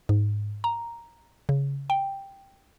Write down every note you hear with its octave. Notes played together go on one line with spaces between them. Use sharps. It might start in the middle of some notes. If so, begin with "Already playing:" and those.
G#2
A#5
C#3
G5